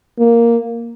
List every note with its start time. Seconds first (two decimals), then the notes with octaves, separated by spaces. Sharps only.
0.19 A#3